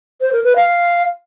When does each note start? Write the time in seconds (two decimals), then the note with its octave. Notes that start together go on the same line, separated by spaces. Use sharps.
0.21 C5
0.32 A#4
0.44 B4
0.56 F5